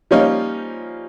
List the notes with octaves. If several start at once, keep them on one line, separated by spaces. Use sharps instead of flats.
F3 G3 A#3 C#4 D#4 F4